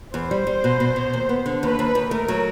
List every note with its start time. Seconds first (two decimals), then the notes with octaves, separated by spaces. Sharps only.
0.14 E2 C5
0.31 G3
0.47 G3
0.64 B2
0.80 B2
0.96 B2
1.13 D#2
1.29 B3
1.46 D3
1.62 D#2 B4
1.79 D#2
1.95 D#2
2.11 A3 A#4
2.28 F#3